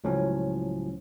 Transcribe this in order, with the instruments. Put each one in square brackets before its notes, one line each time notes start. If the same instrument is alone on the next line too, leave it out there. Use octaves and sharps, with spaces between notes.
[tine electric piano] C#2 A2 F3 F#3 C#4